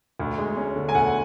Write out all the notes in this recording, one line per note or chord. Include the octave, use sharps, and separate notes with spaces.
D2
G#3
C#4
D3
G#5
D2 F#5